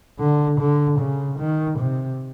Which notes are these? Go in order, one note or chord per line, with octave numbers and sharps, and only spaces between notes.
D3
D3
C#3
D#3
C3